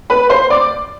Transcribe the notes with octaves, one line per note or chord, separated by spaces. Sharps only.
B4 B5
C5 C6
D5 D6